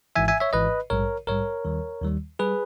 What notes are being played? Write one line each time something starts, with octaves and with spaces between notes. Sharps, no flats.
G#1 G#2 E3 E5 G#5
E5 G#5
C#5 E5
G#1 G#2 E3 B4 D#5
A#1 G#2 G3 A#4 C#5
A#1 G#2 G3 A#4 C#5
D#2 D#3 G3
D#2 D#3 G3
G3 G#4 B4